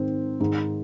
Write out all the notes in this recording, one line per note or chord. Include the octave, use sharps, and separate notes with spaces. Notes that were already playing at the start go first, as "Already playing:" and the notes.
Already playing: G#2 D#3 C4
G#2 D#3